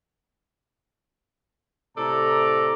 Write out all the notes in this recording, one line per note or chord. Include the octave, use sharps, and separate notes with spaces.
A2 C3 A4 D5 A#5